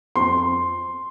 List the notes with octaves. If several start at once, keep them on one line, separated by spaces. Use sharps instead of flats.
F2 C6